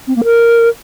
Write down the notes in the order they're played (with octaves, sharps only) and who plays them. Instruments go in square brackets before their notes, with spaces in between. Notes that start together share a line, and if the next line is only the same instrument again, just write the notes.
[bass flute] C4
A#3
A#4